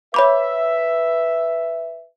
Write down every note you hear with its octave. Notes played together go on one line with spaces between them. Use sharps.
B4 C#5 E5 B5 D6